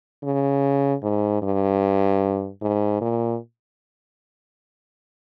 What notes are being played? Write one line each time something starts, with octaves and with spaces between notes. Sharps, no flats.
C#3
G#2
G2
G#2
A#2